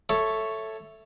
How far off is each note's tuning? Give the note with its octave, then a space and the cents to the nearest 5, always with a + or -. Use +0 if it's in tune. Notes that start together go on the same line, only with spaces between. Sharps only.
A4 +0 C#5 +0 E5 +0